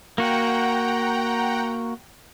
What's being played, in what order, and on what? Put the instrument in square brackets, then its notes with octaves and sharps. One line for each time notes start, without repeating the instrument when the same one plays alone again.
[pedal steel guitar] A#3 F#4 [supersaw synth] F#5 G5 A#5